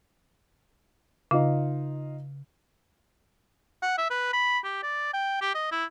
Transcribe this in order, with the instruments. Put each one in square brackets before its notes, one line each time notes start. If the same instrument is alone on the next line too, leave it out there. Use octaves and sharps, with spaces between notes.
[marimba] C#3 [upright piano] D#4 F4 F5
[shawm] F#5
E5
B4
B5
G4
D5
G5
G4
D#5
E4